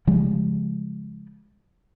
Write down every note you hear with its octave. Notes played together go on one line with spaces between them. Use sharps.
C#3 F3 G3 G#3